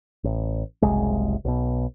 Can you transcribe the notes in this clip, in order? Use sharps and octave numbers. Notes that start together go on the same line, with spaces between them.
A1
F#1 C2 C3 G#3
B1 B2